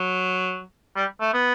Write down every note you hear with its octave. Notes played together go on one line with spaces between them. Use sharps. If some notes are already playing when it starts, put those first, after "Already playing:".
Already playing: F#3
G3
A3
B3